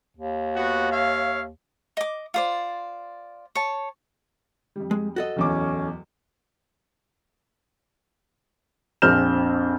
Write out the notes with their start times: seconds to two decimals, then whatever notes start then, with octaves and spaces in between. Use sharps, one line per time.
0.17 D#2
0.55 B3 F#4
0.91 C#5 E5 F5
1.97 D#5 D6
2.34 F4 C5 D5
3.55 C#5 A5
4.76 F2 G3
4.91 G#3
5.16 F#4 A4 D#5
5.36 D1 E2 C#4 D6
9.02 A#1 F2 C4 F6 G6 E7